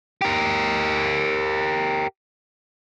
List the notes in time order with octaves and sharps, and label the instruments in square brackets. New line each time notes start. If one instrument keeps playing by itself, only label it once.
[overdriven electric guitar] G4 A#4